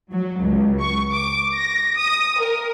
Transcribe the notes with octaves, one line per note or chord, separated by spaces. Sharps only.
F#3
C#2
C#6
D6
A#6
D#6
A#4